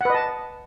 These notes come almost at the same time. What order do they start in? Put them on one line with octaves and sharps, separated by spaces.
F#5 B4 D#5 A5